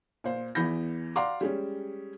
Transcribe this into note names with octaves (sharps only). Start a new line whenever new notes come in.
A#2 C5
E2 E3 B3 B5 G6 A#6
D5 F5 F#5 A#5 C6 D6
G3 G#3 C#4